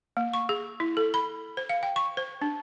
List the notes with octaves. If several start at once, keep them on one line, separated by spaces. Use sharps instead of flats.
A#3
C#6
G#4
E4
A4
B5
C5
F5
G5
C#6
C5
D4